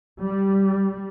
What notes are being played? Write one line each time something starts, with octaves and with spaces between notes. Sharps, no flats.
G3